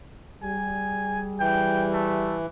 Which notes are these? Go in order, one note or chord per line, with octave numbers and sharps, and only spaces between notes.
G3 G#4 G#5
E3 G5
A3